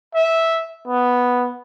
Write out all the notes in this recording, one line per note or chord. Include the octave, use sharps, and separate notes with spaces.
E5
B3